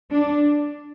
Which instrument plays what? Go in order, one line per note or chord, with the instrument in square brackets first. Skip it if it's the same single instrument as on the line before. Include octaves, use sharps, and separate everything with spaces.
[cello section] D4